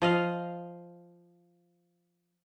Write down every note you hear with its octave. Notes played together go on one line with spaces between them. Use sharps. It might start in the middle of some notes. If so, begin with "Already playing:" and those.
F3 D#5 F5